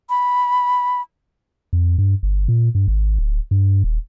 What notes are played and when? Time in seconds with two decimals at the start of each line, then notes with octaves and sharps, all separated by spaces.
0.10 B5
1.73 F2
1.98 G2
2.23 G1
2.48 A#2
2.75 G2
2.88 G#1
3.18 D1
3.51 G2
3.84 D#1